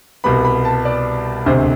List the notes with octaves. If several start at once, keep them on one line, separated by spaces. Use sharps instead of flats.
C2 B2 G3 B3 B5
B5
A5
D5
E1 D2 C3 C5